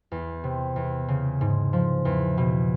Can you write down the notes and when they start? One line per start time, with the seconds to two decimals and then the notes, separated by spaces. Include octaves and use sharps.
0.12 E2
0.44 C3
0.76 E2
1.08 C#3
1.41 G#2
1.73 F3
2.05 E2
2.38 B2